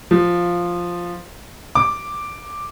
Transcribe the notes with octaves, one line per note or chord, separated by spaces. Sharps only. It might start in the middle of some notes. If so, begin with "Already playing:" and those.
F3
D6